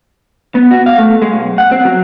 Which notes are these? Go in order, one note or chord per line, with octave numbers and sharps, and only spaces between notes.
B3
F#4
F5
A3
G#3
B1
F#5
C4
F#3